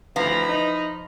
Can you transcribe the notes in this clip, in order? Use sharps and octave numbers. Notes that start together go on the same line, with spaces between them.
D2 E3 F3 F5 A#5 B5
D#4